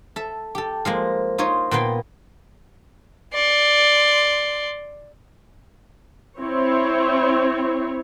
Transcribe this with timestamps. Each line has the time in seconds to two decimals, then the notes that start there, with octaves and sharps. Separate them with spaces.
0.16 A4 E5
0.55 G4 A4
0.85 F3 G#3 A#3
1.38 D#4 F4 A#4 C5 C#5 D#5
1.71 A#2 A#3 B3 B4 G5 C6
3.34 D5 C6
6.40 C4 E4 C#5